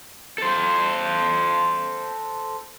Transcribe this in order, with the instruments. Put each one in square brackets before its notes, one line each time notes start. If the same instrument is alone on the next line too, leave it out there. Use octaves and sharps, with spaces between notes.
[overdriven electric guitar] A4 C5